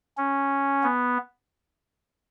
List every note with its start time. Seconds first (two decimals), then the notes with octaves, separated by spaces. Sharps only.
0.18 C#4
0.83 B3